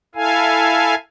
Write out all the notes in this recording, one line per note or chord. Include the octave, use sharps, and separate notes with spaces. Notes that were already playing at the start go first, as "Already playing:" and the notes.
E4 A4 F5 G#5